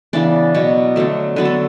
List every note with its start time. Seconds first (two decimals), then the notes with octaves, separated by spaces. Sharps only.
0.13 C#3 E3 B3 D4 D5
0.54 B2 F#3 B3
0.96 D3 F#3 A3
1.36 D3 F#3 B3 B4
1.45 A4